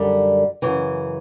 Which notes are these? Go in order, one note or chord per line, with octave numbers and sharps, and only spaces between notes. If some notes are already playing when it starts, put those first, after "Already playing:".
Already playing: F#2 D3 G3
F#2 C#3 E3